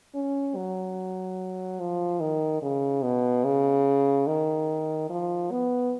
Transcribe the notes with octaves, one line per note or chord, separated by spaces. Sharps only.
C#4
F#3
F3
D#3
C#3
B2
C#3
D#3
F3
B3